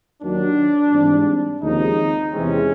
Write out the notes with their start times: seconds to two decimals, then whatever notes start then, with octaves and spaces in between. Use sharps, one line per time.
0.23 D#2 D#3 F#3 D4
0.93 G#2 E3 G3 C4
1.62 D#2 C#3 F3 G#3 C4 D#4
2.32 E2 C3 E3 G#3 C4 C#4